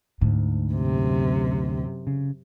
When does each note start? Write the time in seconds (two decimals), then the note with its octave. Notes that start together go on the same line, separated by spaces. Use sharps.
0.21 D2 G#2
0.73 F#2 C3
2.07 C#3